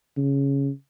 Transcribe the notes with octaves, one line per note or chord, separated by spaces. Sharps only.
C#3